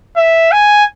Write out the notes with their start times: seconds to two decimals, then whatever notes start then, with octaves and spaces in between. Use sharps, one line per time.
0.16 E5
0.52 G#5